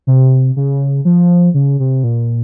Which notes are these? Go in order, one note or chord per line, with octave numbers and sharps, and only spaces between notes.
C3
C#3
F3
C#3
C3
A#2